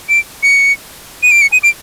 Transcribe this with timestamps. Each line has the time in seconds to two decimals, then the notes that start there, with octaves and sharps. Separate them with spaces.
0.09 D7
0.43 C#7
1.23 D#7
1.31 D7
1.42 C#7
1.53 D#7
1.63 D7